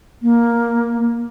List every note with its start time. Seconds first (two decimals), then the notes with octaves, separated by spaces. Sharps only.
0.22 A#3